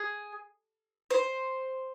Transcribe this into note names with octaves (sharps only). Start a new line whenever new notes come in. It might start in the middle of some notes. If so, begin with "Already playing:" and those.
Already playing: G#4
C5